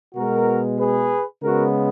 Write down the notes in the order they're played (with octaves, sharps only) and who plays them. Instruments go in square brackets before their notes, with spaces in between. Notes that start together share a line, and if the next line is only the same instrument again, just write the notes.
[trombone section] B2 G#3 B3 F#4 A#4
G#4 B4
C#3 G#3 B3 F#4 A#4